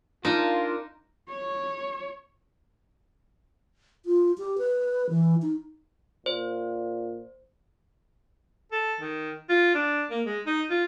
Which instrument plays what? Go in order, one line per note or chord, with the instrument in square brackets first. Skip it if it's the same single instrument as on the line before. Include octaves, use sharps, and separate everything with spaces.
[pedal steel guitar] D4 A#4 A5 [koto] D#4 [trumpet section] F4
[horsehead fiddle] C#5
[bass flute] F4
G4
B4
E3
D#4
[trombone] A#2 [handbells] C5
[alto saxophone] A4
D#3
F4
D4
A#3
G#3
D#4
F4